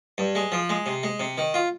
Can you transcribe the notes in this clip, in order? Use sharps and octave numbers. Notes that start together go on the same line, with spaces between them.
G2
G#3
F3
G#3
C3
G#3
C3
D#3
F4